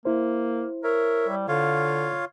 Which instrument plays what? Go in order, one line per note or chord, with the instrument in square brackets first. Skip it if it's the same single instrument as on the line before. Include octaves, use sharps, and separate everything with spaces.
[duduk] A#3 [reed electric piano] E4 C5
[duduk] A#4 [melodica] C#5 E5
[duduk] G3
[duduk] D3 [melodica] F4 C#5 F5